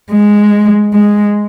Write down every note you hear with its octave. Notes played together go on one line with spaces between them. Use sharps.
G#3
G#3